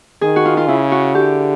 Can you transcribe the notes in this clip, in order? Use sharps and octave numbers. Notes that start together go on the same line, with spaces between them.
D#3 G#4
F#4
F4
F4
C#3 E4
F#4
D3 G4